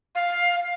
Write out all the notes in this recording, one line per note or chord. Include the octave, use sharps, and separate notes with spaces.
F5